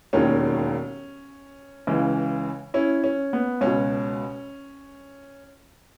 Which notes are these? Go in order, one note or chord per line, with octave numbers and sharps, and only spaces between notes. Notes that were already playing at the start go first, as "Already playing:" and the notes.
E1 D#2 D#3 C#4
C#2 C#3 E3
C#4 E4
C#4
B3
C#2 B2 C#4